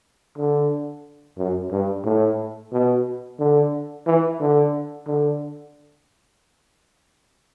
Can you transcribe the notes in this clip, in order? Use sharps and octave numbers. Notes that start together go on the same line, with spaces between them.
D3
F#2
G2
A2
B2
D3
E3
D3
D3